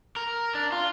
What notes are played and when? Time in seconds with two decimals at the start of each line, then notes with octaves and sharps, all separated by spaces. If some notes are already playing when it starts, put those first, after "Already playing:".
0.16 A#4
0.55 D4
0.72 F4